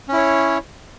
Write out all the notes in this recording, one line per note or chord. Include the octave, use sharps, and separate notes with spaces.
C#4 E4 C#5